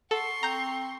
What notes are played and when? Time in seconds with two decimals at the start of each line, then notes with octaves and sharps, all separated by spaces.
0.11 A4 F#5 C6 C#6
0.43 C4 A#5 G6